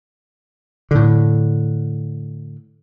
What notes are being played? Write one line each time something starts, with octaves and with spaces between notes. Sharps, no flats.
A2 D3